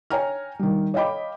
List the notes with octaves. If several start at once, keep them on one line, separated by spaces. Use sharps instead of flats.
C#5 G5 G#5 A#5 F6
D#3 G3
C#5 D#5 F5 G5 B5 D6